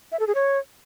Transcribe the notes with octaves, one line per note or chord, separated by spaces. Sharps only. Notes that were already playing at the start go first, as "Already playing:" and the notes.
E5
A4
G#4
C#5